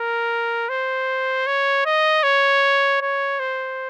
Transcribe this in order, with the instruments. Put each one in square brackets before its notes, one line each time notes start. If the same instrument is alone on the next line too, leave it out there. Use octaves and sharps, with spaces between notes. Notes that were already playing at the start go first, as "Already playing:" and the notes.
Already playing: [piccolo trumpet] A#4
C5
C#5
D#5
C#5
C#5
C5